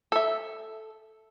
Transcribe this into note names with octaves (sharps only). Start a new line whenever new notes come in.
A4 E5